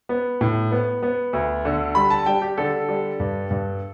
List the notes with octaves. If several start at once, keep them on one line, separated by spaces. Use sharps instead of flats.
B3
A2
B3
B3
D2
D3
G3 B5
A5
G3 G5
G4
D3 A4
G3
G2
G2